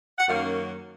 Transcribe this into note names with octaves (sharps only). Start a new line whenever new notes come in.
F#5
F#2 D#3 A#3 C#4 F5